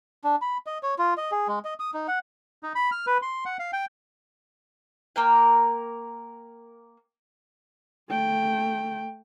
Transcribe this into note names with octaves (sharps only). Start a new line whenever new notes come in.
D4
B5
D#5
C#5
F4
D#5
G#4
G#3
D#5
D#6
D#4
F#5
D#4
B5
F6
B4
C6
F#5
F5
G5
A#3 A#4 G5
A3 G5